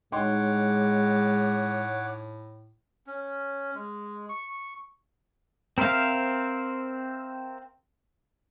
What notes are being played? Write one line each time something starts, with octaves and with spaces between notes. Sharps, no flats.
A2 G#3 D#4 C#5 F#5 G5 C6 D6
C#4
G#3
C#6
C4 A#4 C5 E5 F5